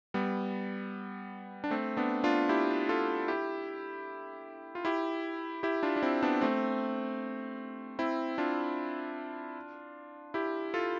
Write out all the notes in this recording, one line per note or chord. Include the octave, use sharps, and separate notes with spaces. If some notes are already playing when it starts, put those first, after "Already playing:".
G3 B3
D4
A3 C4
B3 D4
D4 F4
E4 G4
F4 A4
E4 G4
F4
E4 G4
E4 G4
D4 F4
D4
C4 E4
B3 D4
A3 C4
C4 E4
D4 F4
E4 G4
F4 A4